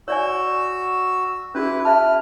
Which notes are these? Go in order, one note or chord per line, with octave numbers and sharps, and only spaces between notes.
F#4 C#5 D5 G#5 E6
C#4 E4 F#4 G#4 B4
E5 A5 F6